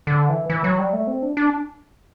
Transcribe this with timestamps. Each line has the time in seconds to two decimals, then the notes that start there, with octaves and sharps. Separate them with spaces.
0.07 D3
0.29 E3
0.50 E3
0.64 F#3
0.79 G3
0.93 A3
1.07 C4
1.22 D4
1.37 D4